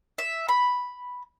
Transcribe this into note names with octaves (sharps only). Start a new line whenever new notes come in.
E5
B5